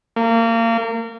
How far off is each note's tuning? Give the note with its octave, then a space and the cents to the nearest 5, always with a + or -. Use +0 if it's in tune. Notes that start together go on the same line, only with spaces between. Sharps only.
A#3 -30